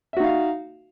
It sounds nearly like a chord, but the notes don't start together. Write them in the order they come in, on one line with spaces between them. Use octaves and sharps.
E5 F#4 D#4 F5